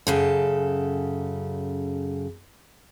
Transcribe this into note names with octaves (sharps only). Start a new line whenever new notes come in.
F#2 C#3 A4